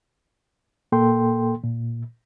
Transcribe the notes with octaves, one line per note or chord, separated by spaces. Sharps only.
A#2 A#3 A4 G5 C6
A#2